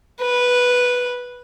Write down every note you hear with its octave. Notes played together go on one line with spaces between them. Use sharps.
B4